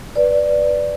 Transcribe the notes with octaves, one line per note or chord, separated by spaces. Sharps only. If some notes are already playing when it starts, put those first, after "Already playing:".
B4 D5